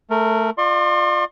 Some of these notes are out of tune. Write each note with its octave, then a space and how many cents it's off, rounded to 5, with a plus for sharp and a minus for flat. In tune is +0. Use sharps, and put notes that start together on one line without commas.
A3 +0 A#4 -20
F4 +0 D5 +40 C6 +35